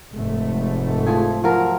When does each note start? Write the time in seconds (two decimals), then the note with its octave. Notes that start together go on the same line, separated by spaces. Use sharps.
0.13 F1 G#2 A3
1.07 F3 G#4
1.44 F3 F#3 A#4